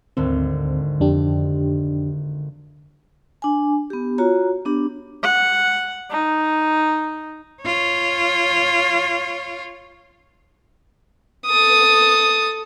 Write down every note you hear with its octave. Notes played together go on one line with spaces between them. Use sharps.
G#1 D2 D3 C4
F2 D4 G4
D4 G#5
B3 G4
F4 F#4 C#5 A#5
B3 D4 G4
F#5
D#4
F4 C#5
A4 D#6